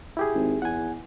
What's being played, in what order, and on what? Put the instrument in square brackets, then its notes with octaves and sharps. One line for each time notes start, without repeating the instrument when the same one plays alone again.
[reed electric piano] E4 G4 G#4
[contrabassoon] G#1
[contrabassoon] E2 [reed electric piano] F#5 G#5